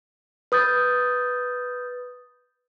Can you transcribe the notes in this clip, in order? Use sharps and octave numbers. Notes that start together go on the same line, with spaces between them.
B4 D#6 G6 A6